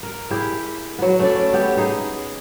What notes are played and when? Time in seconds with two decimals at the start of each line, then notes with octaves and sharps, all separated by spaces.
0.03 A#4
0.30 E4 G4 G#4
0.99 F#3 B3
1.19 A3 C#4 D5
1.53 B3 G4
1.77 D#4 G#4